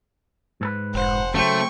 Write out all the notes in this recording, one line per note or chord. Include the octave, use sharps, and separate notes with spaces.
G#2 A4 B4
F1 C5 F#5
C#3 F#3 A3 C5 G5 C#6